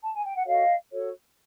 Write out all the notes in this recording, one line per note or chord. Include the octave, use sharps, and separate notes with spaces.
A5
G#5
G5
F#5
F#4 A4 C#5 D#5 F5
F#4 A4 C#5